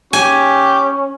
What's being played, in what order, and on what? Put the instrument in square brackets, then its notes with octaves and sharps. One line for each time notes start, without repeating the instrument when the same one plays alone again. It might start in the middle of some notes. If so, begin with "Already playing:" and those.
[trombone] C#4 [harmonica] G4 [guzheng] G#5